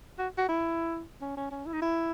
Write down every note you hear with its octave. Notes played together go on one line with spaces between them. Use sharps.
F#4
F#4
E4
C#4
C#4
C#4
E4
D#4
E4